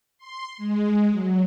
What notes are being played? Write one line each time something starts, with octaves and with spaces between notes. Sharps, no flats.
C6
G#3
F#3